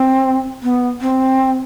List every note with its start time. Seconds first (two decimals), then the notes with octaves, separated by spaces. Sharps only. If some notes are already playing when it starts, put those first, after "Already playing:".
Already playing: C4
0.63 B3
1.01 C4